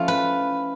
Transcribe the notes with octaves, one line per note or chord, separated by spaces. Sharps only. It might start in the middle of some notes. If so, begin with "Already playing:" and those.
Already playing: F3 A3 C#4 E4 F4
B4